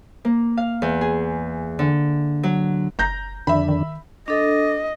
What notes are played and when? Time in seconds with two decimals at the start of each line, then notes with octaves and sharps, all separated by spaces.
0.25 A#3
0.57 F5
0.82 E2
1.01 G#4
1.79 D3
2.43 F#3
2.99 F#1 A#5 G6 A#6
3.47 F2 D3 D#3 D4 E5 B5
3.69 D#3
4.28 D4 A4 D#5